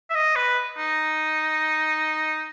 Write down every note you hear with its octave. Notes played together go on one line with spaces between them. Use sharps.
E5
D#5
B4
D#4